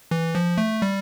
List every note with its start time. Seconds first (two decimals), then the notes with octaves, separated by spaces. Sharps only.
0.11 E3
0.35 F3
0.58 A3
0.82 G3